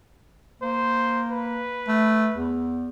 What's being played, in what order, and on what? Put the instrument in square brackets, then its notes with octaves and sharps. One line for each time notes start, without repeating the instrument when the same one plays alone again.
[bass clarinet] A#3 [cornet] C5
[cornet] B4
[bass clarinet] A3
E2